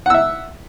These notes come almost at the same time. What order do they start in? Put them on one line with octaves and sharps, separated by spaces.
F#5 E6 E5